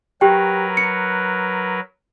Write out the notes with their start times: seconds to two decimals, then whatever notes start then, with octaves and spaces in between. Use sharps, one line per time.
0.21 F#3 G4 A#4 B4 G5
0.77 C#7